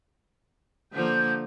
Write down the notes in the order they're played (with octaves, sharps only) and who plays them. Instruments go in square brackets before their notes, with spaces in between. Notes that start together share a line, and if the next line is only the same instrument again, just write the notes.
[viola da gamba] D3 F3 A#3 [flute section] G6